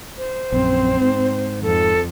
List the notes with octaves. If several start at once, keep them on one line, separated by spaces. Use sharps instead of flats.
C5
A#1 F#2 C4
G#2
F2 A4